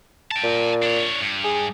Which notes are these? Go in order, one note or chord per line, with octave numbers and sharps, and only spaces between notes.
G5 A5
A#2
D4 C#5
G2
G#4